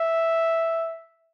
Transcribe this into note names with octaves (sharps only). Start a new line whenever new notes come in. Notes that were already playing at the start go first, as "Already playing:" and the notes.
Already playing: E5